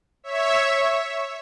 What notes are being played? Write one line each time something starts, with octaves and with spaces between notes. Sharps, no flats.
C#5 E5